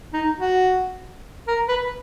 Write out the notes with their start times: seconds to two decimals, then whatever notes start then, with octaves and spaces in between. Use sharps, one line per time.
0.13 D#4
0.39 F#4
1.48 A#4
1.69 B4